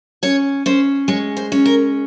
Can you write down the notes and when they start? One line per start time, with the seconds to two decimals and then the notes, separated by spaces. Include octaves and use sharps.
0.23 C#4 C#5
0.66 C#4 C5
1.08 G#3 C#5
1.37 C5
1.52 C#4
1.65 A#4